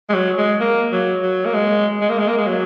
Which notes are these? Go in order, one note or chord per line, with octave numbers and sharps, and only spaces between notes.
G#3
F#3
G#3
A#3
F#3
F#3
A#3
G#3
G#3
A#3
G#3
A#3
G#3
F#3